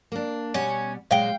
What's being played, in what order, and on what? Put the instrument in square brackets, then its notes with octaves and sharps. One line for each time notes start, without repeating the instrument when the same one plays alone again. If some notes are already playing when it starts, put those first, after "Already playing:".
[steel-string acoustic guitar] A#3 D4
[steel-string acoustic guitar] B2 G3 F#5 [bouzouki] C#4
[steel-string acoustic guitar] A#2 F#3 G#3 [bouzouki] F5 G5